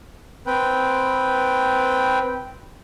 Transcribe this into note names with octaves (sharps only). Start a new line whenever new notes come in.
C4 B4 G5